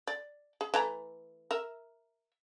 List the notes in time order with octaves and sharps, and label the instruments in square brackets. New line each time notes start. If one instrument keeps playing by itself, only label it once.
[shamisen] D5
G#4
E3 A3 A#5
A#4 E5